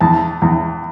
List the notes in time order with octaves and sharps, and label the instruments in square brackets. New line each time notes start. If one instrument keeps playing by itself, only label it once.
[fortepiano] E2 A5
E2